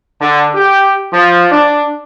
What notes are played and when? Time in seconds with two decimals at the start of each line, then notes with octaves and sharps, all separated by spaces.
0.21 D3
0.54 G4
1.13 F3
1.51 D4